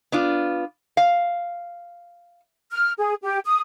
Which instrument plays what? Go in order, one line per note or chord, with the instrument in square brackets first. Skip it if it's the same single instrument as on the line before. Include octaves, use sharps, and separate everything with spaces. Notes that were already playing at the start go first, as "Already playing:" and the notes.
[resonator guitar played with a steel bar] B3 D4 F4
F5
[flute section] F6
G#4
G4
D#6